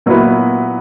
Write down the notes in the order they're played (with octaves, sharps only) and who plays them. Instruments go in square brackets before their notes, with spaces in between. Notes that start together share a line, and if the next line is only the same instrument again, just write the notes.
[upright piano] A#2 F#3 B3 E4 B4